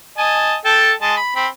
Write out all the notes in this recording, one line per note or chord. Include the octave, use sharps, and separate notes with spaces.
D#5 G#5 A5
A4 G5 A5
G#3 D#5 A5
B5
C4 B5